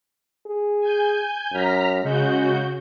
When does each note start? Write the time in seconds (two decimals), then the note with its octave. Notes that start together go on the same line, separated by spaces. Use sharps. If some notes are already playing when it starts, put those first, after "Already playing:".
0.46 G#4
0.81 G#5 G6
1.53 F#2 A#5 F6 B6
2.03 C#3 G#3 F#4 G6